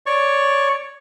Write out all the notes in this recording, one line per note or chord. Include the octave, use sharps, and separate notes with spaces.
C#5 D5 C#6